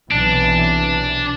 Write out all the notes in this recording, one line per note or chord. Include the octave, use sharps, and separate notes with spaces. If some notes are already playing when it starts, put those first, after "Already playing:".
B1 C3 E3 D4